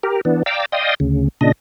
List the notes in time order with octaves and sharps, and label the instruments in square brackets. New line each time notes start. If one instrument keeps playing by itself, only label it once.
[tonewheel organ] G4 A#4
E3 B3 D4
D5 F5 G5 A#5 D6 E6
D5 D#5 F5 G5 C6 D#6
D2 C#3
A#2 C#3 D4 D#5